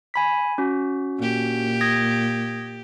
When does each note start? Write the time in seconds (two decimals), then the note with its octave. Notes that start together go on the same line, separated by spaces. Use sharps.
0.14 G#5 B5 B6
0.58 C#4 F#4
1.18 A#2 G4
1.81 D#6 G#6 A#6